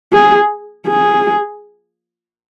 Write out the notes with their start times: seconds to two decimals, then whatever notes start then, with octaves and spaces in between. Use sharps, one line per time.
0.13 G#4
0.87 G#4